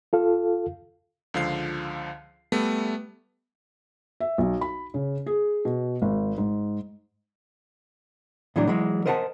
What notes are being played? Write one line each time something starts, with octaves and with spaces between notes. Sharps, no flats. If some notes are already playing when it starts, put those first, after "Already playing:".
F4 A4 F5
C#2 D3 F3 F5 C7
G3 A3 B3
E5
B1
B5
C#3
G#4
B2
G#1
G#2
A2 E3 F#3 D4
E3 F#3 G#3
A#4 C5 D#5 F#5 G#5 A5